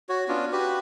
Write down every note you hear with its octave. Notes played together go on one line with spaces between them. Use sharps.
F#4 C#5
B3 C#4 D4 F4
F#4 G4 B4